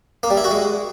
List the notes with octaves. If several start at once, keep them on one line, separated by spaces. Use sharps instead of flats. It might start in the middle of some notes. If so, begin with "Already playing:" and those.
A#3
G3
E4
F#4
G#3